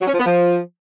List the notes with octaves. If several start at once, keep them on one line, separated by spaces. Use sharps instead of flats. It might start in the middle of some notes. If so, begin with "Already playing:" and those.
F#3
C#4
F3
B3
F3